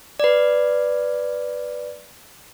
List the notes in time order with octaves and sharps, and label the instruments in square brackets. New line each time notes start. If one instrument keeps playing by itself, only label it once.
[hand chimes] B4 D5